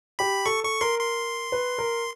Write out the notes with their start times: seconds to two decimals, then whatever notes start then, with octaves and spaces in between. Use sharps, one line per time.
0.19 G4 B5
0.46 A4 C#6
0.63 A4 C#6
0.81 A#4 C6
0.99 C6
1.52 B4
1.78 A#4